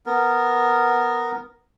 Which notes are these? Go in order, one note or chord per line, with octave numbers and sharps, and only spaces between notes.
B3 A#4